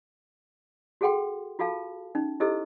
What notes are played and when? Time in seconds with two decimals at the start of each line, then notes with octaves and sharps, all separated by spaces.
1.01 F#4 G#4 A4 F#5 G5 C6
1.59 F4 F#4 A4 F5 A5
2.15 C#4 D#4
2.40 E4 G4 A4 C5 D#5 E6